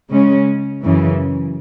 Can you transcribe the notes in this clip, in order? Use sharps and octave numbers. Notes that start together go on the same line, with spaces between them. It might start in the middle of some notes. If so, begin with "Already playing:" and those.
C#3 G#3 C#4
F#2 C#3 E3